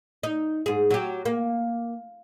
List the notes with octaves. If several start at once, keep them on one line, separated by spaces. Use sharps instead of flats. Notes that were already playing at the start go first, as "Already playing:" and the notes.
D#4
G#2 G#4
F#3 G4
A#3